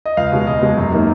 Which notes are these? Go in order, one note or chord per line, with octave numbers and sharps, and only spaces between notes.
D#5
C#2 F5
B2 G#3
C#2 D#5
B2 G#3
F#2
D#3 A#3